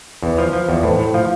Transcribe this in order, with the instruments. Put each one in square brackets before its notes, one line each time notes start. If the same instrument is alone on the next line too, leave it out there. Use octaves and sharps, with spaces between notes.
[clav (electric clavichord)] E2 [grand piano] B4
[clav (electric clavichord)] F3
F3
E2
[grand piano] B4
[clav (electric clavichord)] A2 [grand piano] C5
[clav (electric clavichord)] A2
[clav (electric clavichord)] F3 [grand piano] F5